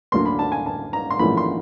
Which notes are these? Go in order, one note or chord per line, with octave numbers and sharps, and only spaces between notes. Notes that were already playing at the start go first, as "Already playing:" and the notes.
D2 D3 F#3 A#3 D4 C6
B5
A5
G#5
A5
A#5
C6
A#1 G#2 E3 A3 C#4 B5
C6